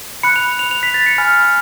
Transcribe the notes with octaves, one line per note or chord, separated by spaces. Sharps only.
B5 F#6 C#7
F7
F7
F7
B6
A6
C#7
G#5 B5 F6